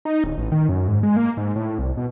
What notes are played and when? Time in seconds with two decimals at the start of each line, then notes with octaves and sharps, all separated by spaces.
0.05 D#4
0.24 D1
0.38 A1
0.52 D#3
0.69 F#2
0.87 G#2
1.03 G#3
1.16 A#3
1.37 G#2
1.56 A2
1.79 C2
1.97 B2